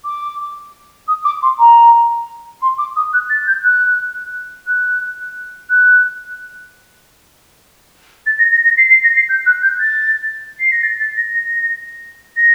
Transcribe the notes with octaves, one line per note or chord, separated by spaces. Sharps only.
D6
D#6
D6
C6
A#5
C6
D6
D#6
F#6
A6
G6
F#6
F#6
F#6
A6
A#6
A#6
A#6
C7
C7
A#6
C7
G6
F#6
G6
A6
C7
A#6
A6
A6
A#6
A#6
A#6